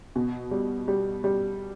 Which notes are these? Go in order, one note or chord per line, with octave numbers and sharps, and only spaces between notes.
B2
G3
G3
G3